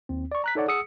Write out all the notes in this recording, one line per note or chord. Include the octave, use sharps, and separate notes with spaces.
D#2 C4
D5 C#6
A#5 F#6 B6
D#4 A4 C#5 D5 F#5
G#4 F#5 D#6 E6 C#7